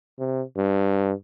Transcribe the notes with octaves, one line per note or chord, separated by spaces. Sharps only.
C3
G2